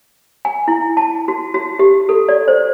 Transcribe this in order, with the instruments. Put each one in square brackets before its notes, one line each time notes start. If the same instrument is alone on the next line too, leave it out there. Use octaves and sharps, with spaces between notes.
[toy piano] G#5
E4
A5
F#4
F#4
G4
A4
D5
C5